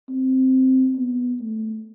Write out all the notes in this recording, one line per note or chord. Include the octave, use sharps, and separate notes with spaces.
C4
B3
A3